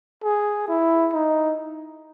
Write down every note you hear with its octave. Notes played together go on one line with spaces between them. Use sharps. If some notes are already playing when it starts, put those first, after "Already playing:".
G#4
E4
D#4